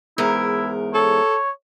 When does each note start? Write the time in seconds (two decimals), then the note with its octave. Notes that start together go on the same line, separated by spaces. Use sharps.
0.18 E2 G#2 E4 A#4
0.94 A4 C#5